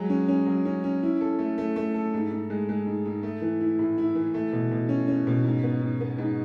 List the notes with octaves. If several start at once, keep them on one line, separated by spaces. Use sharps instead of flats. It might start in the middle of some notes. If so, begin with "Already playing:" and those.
Already playing: F#3 G#3
C#4
C#4
F#3
C#4
C#4
E4
A4
A3
A3
A3
A4
G#2
G#2
G#3
G#3
G#2
G#2
A3
E3
E4
A2
E4
E3
A3
B2
B2
C#4
C#4
B2
G#2
B3
G#2
B3
G#2